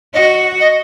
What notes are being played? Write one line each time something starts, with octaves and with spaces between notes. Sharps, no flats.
F#4 D#5
D#5